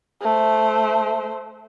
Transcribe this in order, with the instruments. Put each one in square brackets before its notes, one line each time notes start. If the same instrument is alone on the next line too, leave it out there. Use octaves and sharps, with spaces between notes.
[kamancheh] A3 C5